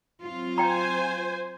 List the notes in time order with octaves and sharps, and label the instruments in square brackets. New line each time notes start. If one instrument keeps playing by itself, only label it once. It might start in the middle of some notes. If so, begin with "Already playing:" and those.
[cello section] F#3 C4 F4
[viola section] C5 G#5 [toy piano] G5 A#5